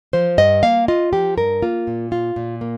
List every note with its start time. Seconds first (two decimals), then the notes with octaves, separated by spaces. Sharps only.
0.13 F3 C5
0.38 G2 D#5
0.63 A#3 F5
0.88 F4 D#5
1.13 F3 G4
1.38 G2 A#4
1.62 A#3 F4
1.87 A#2
2.12 F4
2.36 A#2
2.61 A#3